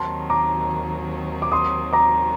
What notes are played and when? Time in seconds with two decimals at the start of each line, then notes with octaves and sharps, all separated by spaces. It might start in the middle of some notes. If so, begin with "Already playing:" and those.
Already playing: D#2 D#3 F#3 C4 A5 C6
0.30 A#5 D6
1.42 D6
1.52 C6 D#6
1.93 A#5 D6